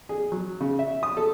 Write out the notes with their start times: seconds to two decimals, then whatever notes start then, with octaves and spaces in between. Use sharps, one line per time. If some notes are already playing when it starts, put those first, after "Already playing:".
0.09 G#4
0.32 F#3
0.61 C#3
0.79 E5
1.03 D#6
1.17 A4